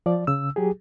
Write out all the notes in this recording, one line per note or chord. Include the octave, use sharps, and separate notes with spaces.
F3 D5
C#3 E6
F#3 G4 G#4